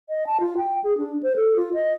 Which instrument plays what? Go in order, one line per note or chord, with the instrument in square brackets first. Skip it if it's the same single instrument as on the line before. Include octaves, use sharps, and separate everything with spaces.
[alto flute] D#5
A5
F4
G5
G#4
D4
C5
A4
F4
D#5